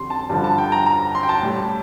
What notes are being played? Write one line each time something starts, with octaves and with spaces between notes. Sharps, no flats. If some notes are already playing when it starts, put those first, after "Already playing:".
Already playing: F2 D3 G3 C6
A5
G2 D3 F3 A5
A5
G5
A#5
A#5
C6
G5
A5
A2 G3